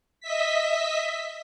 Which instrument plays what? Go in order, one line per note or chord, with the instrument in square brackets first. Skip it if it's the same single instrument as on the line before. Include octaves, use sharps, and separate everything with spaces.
[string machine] D#5 E5 B6